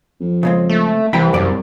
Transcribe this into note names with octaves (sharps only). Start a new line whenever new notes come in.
F2
C#3 G#3 C4
A3
C2 E3 G5 B5
F#2 D5